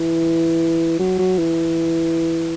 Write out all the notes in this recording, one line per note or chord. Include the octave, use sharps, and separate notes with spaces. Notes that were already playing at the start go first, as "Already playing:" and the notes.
Already playing: E3
F#3
F#3
E3